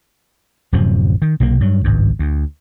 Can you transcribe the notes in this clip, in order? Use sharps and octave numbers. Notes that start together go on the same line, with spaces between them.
D1 F#2 C3 F3
D#3
B1 C3 A3 A#3
G2 F#3
G#1 C#2 G2
D2